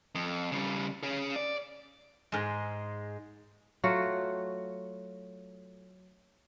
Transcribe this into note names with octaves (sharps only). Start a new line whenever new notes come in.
F2
C#3 G3
C#4 G#4
D5
G#2 G#3
F#3 A3 F4 F#4